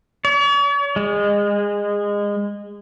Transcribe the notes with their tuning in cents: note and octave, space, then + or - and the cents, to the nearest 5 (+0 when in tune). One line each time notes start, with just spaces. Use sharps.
C#5 +45
G#3 -25